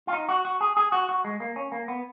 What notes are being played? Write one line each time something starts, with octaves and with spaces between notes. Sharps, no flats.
F4
D#4
F#4
F#4
G#4
G#4
F#4
F#4
G#3
A#3
C#4
A#3
B3